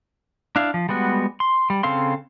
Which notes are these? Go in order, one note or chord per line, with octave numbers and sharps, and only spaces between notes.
D4 E4 F5
F3
G3 G#3 B3 F#4
C6
G3
C#3 C4 A4 F5 C6